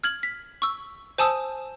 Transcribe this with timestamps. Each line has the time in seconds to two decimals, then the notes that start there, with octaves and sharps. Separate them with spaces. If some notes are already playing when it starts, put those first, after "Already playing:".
0.04 F6 G#6 F#7
0.23 B6
0.62 C#6 E6
1.18 C5 G#5 A5 D#6 E6